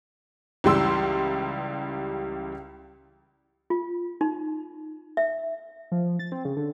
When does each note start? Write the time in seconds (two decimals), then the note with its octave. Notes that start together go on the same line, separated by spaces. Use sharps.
0.64 C#2 E3 G3 C6 E6
3.70 F4
4.21 D#4
5.17 E5
5.92 F3
6.19 A6
6.32 C4
6.45 C#3
6.57 D3